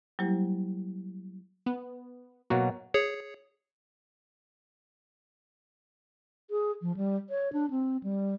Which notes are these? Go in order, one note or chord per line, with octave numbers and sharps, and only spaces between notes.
F#3 G3 A#3 E4 G4 C5
B3
B2 F#3 A#3 F#4
G#4 C#5 C#7
G#4
F3
G3
C#5
D4
C4
G3